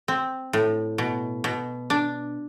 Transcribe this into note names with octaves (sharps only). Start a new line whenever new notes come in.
C4
A2
B2
B2
D4